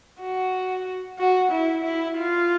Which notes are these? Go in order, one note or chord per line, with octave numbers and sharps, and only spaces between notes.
F#4
F#4
E4
E4
F4